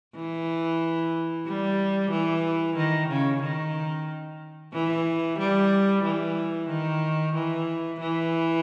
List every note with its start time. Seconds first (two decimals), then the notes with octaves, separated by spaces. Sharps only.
0.15 E3
1.46 G3
2.11 E3
2.77 D#3
3.09 C#3
3.42 D#3
4.73 E3
5.39 G3
6.03 E3
6.70 D#3
7.35 E3
8.00 E3